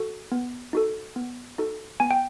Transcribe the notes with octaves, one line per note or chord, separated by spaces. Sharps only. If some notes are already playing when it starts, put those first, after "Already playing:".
Already playing: F#4 A4
B3
D#4 F#4 A4
B3
D#4 F#4 A4
B3 G#5
G5